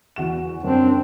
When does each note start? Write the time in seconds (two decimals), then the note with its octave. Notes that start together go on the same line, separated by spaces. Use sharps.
0.16 E2 F#4 E7
0.64 F#2 C4 D4